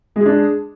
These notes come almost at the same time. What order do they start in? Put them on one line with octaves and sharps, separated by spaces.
G#3 G#4 D4